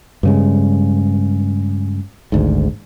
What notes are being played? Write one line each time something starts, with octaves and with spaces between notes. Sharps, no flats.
G2 C#3 G#3
G#1 D2 G#2